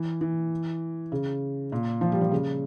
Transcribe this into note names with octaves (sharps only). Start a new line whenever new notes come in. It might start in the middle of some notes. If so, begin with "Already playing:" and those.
Already playing: E3
E3
C#3
A#2
F3
G3
F3
C#3